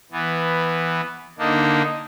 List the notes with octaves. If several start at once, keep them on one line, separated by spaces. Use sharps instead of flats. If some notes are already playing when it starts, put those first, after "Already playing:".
E3 B3
D3 A#3 D4 D#4